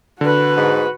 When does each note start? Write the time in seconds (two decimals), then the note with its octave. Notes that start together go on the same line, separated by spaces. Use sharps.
0.21 D3 F#4 B4
0.57 G#2